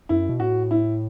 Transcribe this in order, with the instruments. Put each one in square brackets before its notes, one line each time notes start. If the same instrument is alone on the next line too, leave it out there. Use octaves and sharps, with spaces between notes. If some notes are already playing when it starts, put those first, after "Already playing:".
[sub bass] F#2 [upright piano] E4
[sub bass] B2
[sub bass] A2 [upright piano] F#4
[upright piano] E4